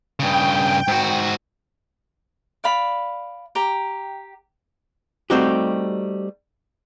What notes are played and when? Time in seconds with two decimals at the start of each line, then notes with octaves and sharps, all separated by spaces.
0.20 G2 C#3 G5
0.88 G#2 F#4
2.64 D5 F5 B5
3.55 G4 G5 A#5
5.30 G3 A3 C4 D#4 F#4 G4